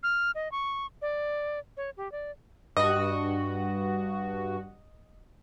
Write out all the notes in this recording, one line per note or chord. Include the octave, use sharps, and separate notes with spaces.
F6
D#5
C#6
D5
C#5
G4
D5
G2 F#4 D#5